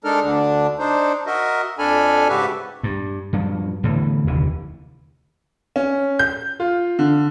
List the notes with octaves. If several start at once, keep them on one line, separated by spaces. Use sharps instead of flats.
G#3 D4 D#4 A4 A#4 F6
D2 D3 D4
D4 D#4 C5
F#4 A#4 D#5 E5
F2 D4 A4 G#5 B5 F6
G#2 C#3 F#4 G4 B4 E5
G2
G2 F3 F#3
E2 A2 D3 E3
F1 D#2 D3 E3
C#4
G6
F4
D3